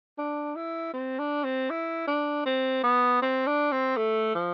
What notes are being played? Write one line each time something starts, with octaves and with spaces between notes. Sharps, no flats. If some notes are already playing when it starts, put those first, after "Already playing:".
D4
E4
C4
D4
C4
E4
D4
C4
B3
C4
D4
C4
A3
F3